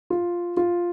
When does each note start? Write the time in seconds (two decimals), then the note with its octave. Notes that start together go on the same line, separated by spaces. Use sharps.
0.10 F4
0.57 F4